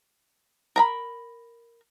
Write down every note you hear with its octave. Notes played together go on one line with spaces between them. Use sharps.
A#4 A#5 B5